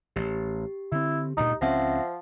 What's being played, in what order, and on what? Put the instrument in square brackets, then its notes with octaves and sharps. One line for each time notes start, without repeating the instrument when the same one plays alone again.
[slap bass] A1 [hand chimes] G4
[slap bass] D3 C4 [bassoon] E4
[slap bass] D2 G2 A#2 [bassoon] D#4
[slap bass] C#2 C4 C#4 [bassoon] F3 [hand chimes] E5 F#5 A#6